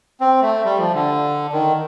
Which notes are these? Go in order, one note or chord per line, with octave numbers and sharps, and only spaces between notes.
C4
A3
G3
F3
D3
D#3